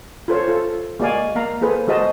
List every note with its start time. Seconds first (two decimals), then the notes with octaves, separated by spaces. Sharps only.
0.28 F4 A4 C5 C#5
0.48 F4 A4
1.00 G#3 A#3 F#4 D5 F5 G#5
1.35 A#3 F5 A#5
1.61 A#3 G#4 A4 B4 C5
1.88 G#3 F#4 C5 D#5 A5